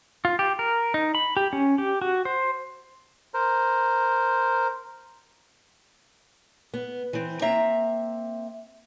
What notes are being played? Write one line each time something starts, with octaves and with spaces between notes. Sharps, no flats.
F4
G4
A#4
D#4
B5
G4
C#4
G4
F#4
C5
A#4 C5
B3
E3 C4
A#3 C4 E5 A#5